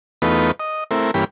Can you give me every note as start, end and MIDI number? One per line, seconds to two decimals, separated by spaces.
0.22 0.51 40
0.22 0.51 57
0.22 0.51 59
0.22 0.51 63
0.22 0.51 65
0.22 0.51 71
0.60 0.84 75
0.91 1.11 57
0.91 1.11 60
0.91 1.11 64
0.91 1.11 70
1.14 1.24 43
1.14 1.24 52
1.14 1.24 58
1.14 1.24 61
1.14 1.24 67
1.14 1.24 83